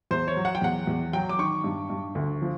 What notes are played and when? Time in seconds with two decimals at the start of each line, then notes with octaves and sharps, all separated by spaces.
0.11 E2 C5
0.28 C#5
0.37 F#3
0.45 F#5
0.55 G5
0.62 E2 F#5
0.87 E2
1.13 F#3 G5
1.29 D6
1.39 D#3 C#6
1.64 G2
1.90 G2
2.15 D2
2.42 F3